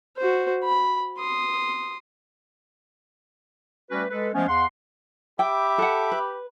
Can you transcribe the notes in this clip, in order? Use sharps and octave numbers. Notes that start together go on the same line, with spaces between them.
F#4 C5
B5
C6 D#6
G3 A3 C#4 F#4 B4
G#3 A4 B4
F3 G#3 A3 B3 C#4
E2 F5 F#5 C6
G4 E5 G5 B5 D6
A4 F#5
B4